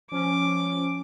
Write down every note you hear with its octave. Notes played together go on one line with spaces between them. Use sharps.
F3 C#4 D6